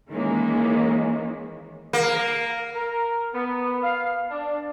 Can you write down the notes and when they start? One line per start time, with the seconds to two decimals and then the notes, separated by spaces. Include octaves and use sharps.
0.11 D#3 E3 G#3 A#3 C#4
1.93 A#3
2.74 A#4
3.33 B3
3.81 F5
4.31 D4